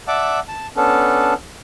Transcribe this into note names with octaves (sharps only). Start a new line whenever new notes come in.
D5 E5 F#5 A5 D6
A5
B3 C#4 D4 A4